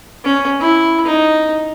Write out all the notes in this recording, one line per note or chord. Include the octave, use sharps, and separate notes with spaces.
C#4
E4
D#4